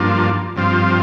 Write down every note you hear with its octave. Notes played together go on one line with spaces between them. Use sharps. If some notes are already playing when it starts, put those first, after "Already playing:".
Already playing: G2 F3 A#3 D4 F4
G2 F3 C4 F4